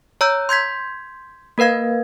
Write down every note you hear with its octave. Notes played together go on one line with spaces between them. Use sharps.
C#5 A#5 E6 G6
C6 G6 G#6 B6
A#3 A#4 B4 F5 G#6